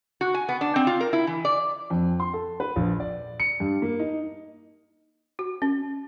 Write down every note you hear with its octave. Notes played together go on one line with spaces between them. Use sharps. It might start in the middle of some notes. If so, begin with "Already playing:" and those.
F#4
G#5
B3
D4
C4
F4
A#4
E4
E3
D5
F2
C6
A4
B4
A#1
D5
C#7
G2
A#3
D#4
F#4
C#4